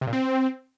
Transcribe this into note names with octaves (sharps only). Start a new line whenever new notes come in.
C3
A#2
C4